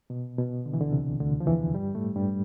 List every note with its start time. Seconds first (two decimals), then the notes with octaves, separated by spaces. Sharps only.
0.10 B2
0.39 B2
0.66 D3
0.74 E3
0.81 D2 D3
0.92 C2 C3
1.20 D2 D3
1.40 F3
1.47 E2 E3
1.75 G2 G3
1.95 A2 A3
2.15 G2 G3